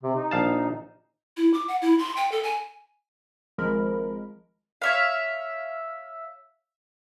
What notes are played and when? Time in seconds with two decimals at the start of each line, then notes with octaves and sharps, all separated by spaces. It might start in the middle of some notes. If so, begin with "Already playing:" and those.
0.03 C3
0.16 D#4
0.31 A#1 F5 A5
1.37 E4
1.54 D6
1.68 F#5
1.82 E4
1.99 C6
2.17 G5
2.32 A4
2.43 G#5
3.58 G#1 F3 G#3 A#4 B5
4.82 C#5 E5 F5